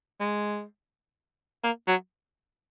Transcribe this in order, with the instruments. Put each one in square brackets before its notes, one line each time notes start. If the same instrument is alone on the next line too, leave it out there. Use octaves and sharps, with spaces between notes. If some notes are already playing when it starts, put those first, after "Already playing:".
[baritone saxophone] G#3
A#3
F#3